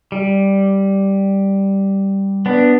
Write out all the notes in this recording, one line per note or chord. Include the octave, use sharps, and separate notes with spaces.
G3
B3 D4